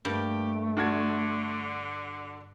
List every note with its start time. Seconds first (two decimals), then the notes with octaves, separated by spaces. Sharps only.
0.05 G2 A3 A#3 G4
0.77 D3 D4 F#4 G#6